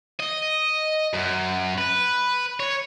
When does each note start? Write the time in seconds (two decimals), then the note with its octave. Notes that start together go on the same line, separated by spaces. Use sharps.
0.20 D#5
1.14 F#2
1.78 B4
2.60 C#5